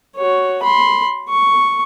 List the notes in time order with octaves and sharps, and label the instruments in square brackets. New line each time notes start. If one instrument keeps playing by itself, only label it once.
[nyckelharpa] F#4 C#5
B5 C6
C#6